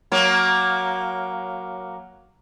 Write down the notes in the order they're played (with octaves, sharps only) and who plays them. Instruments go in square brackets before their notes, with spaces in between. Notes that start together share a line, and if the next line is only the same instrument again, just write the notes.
[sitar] F#3 A#3